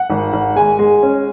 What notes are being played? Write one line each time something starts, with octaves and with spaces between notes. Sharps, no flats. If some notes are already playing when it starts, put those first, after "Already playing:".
Already playing: F#5
G#1
G#1
G#3 G#5
G#3
C#4